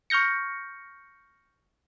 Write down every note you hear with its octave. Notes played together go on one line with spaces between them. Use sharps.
C#6 F6 G6 A#6 C#7